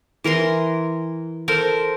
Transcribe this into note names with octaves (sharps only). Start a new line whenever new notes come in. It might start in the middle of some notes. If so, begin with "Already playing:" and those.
E3 A#4 A#5 C6
A4 A#4 C5